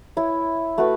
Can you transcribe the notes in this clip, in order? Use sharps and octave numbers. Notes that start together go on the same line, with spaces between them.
E4 C#5 E5
A3 F#4 B4